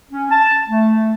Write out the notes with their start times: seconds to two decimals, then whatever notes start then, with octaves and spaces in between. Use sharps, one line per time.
0.11 C#4
0.31 A5
0.68 A3